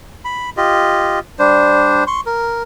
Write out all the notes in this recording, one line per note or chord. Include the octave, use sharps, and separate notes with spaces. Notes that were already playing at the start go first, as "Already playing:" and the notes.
B5
F4 G4 D#5
G3 D4 C5
C6 C#6
A#4